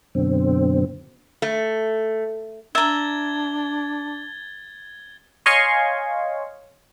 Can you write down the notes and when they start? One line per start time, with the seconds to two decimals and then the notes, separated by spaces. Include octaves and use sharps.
0.15 F#2 B2 D3 C4
1.42 A3
2.75 D4 E5 A#5 G#6 A6 G7
5.46 C#5 D#5 F5 G#5 C6 C#6